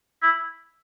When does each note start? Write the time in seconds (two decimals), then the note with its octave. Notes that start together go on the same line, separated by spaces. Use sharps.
0.23 E4